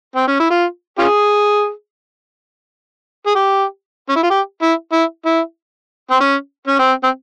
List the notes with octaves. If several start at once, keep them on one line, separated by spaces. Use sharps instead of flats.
C4
C#4
E4
F4
C#4 F4 G#4
G#4
G4
C#4
E4
F4
G4
E4
E4
E4
C4
C#4
C#4
C4
C4